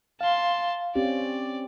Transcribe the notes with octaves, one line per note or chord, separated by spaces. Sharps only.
F5 A5 C6
C4 C#4 G4 D5